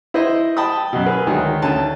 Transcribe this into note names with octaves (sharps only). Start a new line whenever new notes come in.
E4 C5 D#5
G5 A5 B5 D#6
F#2 B2
G#4 A#4 B4
D2 D#3 F#3 G#3
D2 C#4 A5